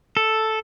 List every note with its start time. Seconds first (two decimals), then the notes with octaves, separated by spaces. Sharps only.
0.17 A4